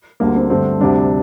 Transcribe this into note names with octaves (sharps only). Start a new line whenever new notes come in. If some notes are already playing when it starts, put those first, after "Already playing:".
D2 D3 G3 A#3
C4
G2 D3 A3 C4
D2 C3 G3 D4